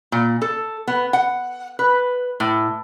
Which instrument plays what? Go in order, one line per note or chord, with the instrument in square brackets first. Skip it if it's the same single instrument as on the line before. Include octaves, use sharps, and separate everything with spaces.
[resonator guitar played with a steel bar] A#2
A4
B3
F#5
B4
A2